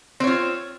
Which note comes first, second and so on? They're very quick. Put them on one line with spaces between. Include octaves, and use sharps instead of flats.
C4 C#5 F4